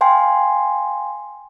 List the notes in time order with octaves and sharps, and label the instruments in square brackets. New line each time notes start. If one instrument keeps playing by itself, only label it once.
[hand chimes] F5 G5 G#5 C6